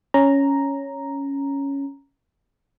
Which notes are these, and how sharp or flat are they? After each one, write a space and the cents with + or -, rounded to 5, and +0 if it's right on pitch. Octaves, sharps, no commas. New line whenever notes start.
C#4 +0 A#5 +0